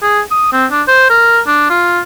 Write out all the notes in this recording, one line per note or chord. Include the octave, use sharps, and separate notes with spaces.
G#4
D#6
C4
D4
C5
A#4
D4
F4